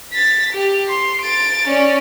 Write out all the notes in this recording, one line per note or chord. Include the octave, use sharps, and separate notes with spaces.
A6 B6
G4
C6
A6 D7
C#4 D5